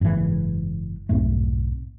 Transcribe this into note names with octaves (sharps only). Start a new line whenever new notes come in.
F#1 G#2 C3 E3
B1 F2 G#2 A3